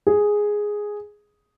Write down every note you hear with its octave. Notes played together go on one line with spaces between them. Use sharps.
G#4